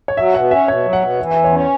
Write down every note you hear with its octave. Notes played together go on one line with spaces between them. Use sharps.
C#5
F#3 E5
B2 F#5
C#4 E5
B2 C#5
F#3
F#5
B2
E3 E5
E2 E5
C#5
C#4 B4